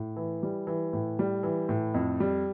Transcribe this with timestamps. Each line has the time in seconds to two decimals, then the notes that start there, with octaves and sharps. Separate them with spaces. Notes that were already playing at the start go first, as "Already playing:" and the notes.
Already playing: A2
0.16 E3
0.43 G3
0.67 E3
0.93 A2
1.19 G3
1.43 E3
1.69 A2
1.94 F2
2.20 G3